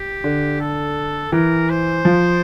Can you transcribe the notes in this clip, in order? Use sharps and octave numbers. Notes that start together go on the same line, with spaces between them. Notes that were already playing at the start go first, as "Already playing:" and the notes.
Already playing: G4
D3
A4
E3 A#4
C5
F3